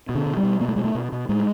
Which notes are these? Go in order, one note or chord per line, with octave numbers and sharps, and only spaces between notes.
B2
D3
B2
G3
B2
B2 A#3
A3
B2 G#3
A3
B2
B2
A2 G#3